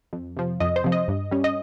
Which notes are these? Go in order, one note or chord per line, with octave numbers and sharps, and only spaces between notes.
F2
C3 F3
F2 D#5
C5
C3 F3
D#5
G2
G3 C#4
D#5